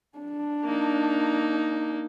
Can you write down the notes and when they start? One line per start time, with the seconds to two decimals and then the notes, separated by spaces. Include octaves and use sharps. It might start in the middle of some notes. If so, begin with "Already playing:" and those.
0.18 D4
0.64 A#3 D#4